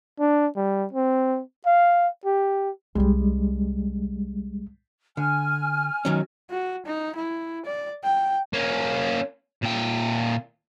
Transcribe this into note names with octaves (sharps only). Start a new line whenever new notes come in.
D4
G3
C4
F5
G4
C2 G3 G#3 C#4
D3 G#5 F6
D#3 F#3 C#4
F#4
D#4
E4
D5
G5
A#3 C#4
A#2 G5